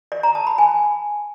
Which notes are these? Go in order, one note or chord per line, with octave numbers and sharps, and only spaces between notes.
D5
A#5
A5
B5
G#5